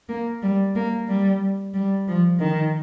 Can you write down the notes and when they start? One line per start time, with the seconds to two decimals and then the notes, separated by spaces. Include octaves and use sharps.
0.09 A#3
0.42 G3
0.75 A#3
1.08 G3
1.74 G3
2.08 F3
2.40 D#3